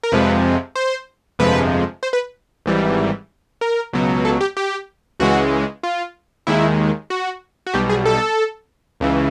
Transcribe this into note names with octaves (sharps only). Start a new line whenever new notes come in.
A#4
F2 C3 F3 G#3 B4
C5
G1 F2 C3 F3 G#3 B4
C5
B4
G#1 G#2 E3 G3
A#4
C#2 B2 F#3
A4
G4
G4
C#2 C#3 E3 G#3 F#4
F4
D#2 D#3 G#3 E4
F#4
F#4
B1 B2 G3 G4
G#4
A4
C#2 C#3 E3